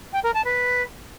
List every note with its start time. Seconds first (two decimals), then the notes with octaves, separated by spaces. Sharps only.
0.13 G5
0.23 A#4
0.34 A5
0.45 B4